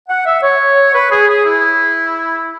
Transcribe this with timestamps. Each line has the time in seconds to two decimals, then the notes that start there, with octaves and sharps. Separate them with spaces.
0.09 F#5
0.26 E5
0.42 C#5
0.94 B4
1.10 G#4
1.28 G#4
1.45 E4